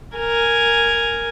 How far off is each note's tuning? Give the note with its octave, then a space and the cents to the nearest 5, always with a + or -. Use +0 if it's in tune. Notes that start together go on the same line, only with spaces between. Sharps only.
A#4 +0 G#5 +0